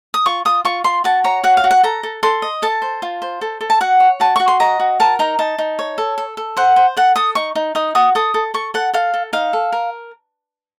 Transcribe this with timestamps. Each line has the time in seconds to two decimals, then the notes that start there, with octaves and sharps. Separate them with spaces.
0.14 D#6
0.26 F4 C#6
0.45 F4 D#6
0.65 F4 C#6
0.84 F4 C6
1.04 F#4 A5
1.24 C#5 A#5
1.44 F#4 F#5
1.57 F5
1.64 F#4
1.71 F#5
1.83 A4 A#5
2.03 A4
2.23 A4 C6
2.42 D#5
2.62 A4 A5
2.82 C5
3.02 F4
3.22 C5
3.41 A4
3.61 A4
3.70 A5
3.81 F#4 F#5
4.00 C#5
4.20 F#4 A5
4.36 F#4 C#6
4.48 C6
4.60 D#5 A#5
4.80 F#4
5.00 A#4 A5
5.19 D#4 A#5
5.39 D#4 A5
5.58 D#4
5.79 C#5
5.98 A4
6.18 A4
6.37 A4
6.57 C5 F#5
6.76 C5
6.97 A4 F#5
7.16 A4 D#6
7.35 D#4 C#6
7.55 D#4
7.75 D#4 D#6
7.95 F#4 D#6
8.15 A4 D#6
8.34 A4
8.54 A4 C#6
8.74 A4 F#5
8.94 A4 F5
9.14 A4
9.33 D#4 F5
9.53 A4
9.72 A#4